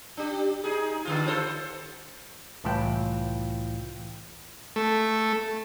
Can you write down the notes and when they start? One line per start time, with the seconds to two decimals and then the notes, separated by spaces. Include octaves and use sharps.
0.17 D4 G4
0.64 D#4 G#4
1.05 G2 D3 F4
1.28 F4 A4 C5
2.64 C2 A2 E3 F4 G5
4.76 A3